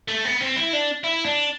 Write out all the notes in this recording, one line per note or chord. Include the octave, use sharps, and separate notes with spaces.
A3
B3
C4
E4
D4
E4
D4